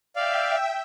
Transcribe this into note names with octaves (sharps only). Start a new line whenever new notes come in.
D5 E5 F5 G5